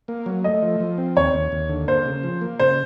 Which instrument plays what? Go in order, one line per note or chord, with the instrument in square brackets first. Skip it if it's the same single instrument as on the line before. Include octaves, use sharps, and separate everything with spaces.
[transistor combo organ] A#3
F#3
[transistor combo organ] A3 [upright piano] D#5
[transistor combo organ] F3
F3
C4
[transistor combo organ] D#2 [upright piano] C#5
[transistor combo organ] D#2
D#2
D3
[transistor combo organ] A#3 [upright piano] C5
[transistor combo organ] C#3
F3
A#3
[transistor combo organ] C#3 [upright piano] C5